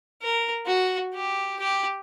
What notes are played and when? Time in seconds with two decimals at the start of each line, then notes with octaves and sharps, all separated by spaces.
0.23 A#4
0.66 F#4
1.14 G4
1.59 G4